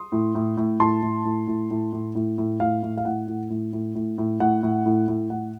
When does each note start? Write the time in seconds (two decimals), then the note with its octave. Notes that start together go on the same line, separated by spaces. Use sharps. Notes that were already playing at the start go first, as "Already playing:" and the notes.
Already playing: C6 D#6
0.12 A2
0.35 A2
0.57 A2
0.80 A2 A5 C6
1.02 A2
1.25 A2
1.47 A2
1.71 A2
1.93 A2
2.15 A2
2.38 A2
2.60 A2 F5
2.83 A2
2.97 F5
3.05 A2 F#5
3.28 A2
3.50 A2
3.73 A2
3.95 A2
4.18 A2
4.40 A2 F#5
4.63 A2
4.86 A2
5.08 A2
5.30 A2 F#5